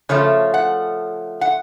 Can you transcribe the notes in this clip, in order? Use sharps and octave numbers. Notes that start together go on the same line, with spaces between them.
C#3 F3 A3 C#5
F#5
F#5